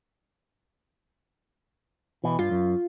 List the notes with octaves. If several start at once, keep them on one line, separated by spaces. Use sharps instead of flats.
B2 E3
G2 F4
F#2